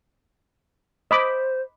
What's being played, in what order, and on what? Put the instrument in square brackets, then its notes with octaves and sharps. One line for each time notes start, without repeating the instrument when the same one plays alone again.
[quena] C5 [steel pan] D#5 B5 D6